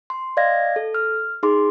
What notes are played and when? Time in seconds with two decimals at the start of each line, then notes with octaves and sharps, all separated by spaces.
0.10 C6
0.37 D5 D#5 F5 G#6 A#6
0.76 A4
0.95 F6
1.43 D#4 G#4 C6 D6